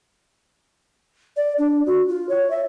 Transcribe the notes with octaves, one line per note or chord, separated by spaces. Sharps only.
D5
D4
F#4
F4
C#5
E5